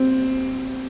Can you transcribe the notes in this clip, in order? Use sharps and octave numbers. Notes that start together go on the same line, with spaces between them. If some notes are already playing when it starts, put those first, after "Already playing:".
Already playing: C4